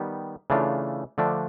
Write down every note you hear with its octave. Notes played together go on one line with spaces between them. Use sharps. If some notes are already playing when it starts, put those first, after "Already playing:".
Already playing: D#3 G3 B3
C#3 E3 A3 D4 F4
D3 F3 A3 D4